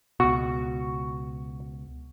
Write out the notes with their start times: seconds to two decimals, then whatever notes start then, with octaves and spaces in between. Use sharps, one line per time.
0.20 C#2 B2 F#4 C#6